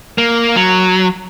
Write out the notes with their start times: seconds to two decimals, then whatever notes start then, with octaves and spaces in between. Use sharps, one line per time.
0.18 A#3
0.56 F#3